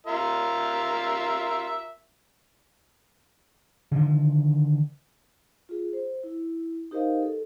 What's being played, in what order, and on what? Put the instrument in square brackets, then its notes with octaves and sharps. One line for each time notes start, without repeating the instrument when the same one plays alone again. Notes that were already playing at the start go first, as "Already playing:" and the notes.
[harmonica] F4 A#4 E5
[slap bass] D3 D#3 F3
[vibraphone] F4 G#4
C5
E4
D#4 G4 A#4 C5 D#5 F5
A4